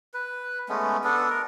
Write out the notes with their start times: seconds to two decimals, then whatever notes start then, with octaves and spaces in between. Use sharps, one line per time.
0.14 B4
0.69 G#3 A3 B3 C#4
1.04 B3 D4 A4
1.30 A#4